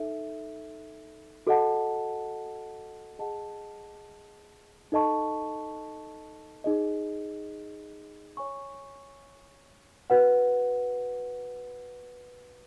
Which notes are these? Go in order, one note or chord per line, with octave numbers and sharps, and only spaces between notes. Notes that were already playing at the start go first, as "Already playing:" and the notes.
Already playing: D#4 A4 E5
F#4 A4 D#5 F#5 A5
G#4 D#5 F#5 A5
D#4 A4 D#5 A5 C#6
D#4 G#4 D#5
C#5 G#5 C#6
F#4 B4 F#5